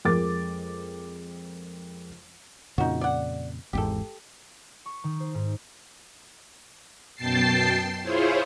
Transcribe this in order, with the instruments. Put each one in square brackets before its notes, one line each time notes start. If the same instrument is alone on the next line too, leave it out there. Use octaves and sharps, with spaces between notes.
[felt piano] F2 G#3 A#4 D6 A6
[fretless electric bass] F2 A#2 C#3 [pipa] D#4 F#4
[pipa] D5 F#5
[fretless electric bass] G#1 E2 G#2 [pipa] G4 A4
[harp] C#6
D#3
C5
G#2
[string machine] F#2 B2 G5 A5 A6 C7
E4 F4 G#4 C5 C#5